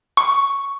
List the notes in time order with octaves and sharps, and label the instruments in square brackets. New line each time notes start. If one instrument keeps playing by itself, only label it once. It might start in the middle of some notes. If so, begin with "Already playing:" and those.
[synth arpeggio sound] C#6